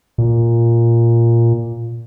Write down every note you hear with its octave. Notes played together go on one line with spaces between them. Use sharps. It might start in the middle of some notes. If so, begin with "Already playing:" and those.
A#2